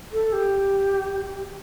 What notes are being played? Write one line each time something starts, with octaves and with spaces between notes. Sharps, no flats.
A4
G4